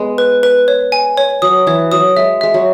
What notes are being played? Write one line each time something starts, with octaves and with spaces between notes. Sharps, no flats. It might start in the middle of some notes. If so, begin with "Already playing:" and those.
Already playing: G#3 B3
B4
B4
C#5
G#5
C#5
F#3 D#6
E3 C#5
F#3 D#6
G#3 E5
G#3 E5
F#3